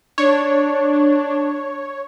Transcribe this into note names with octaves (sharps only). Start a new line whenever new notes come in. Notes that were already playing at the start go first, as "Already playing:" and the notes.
D4 C#5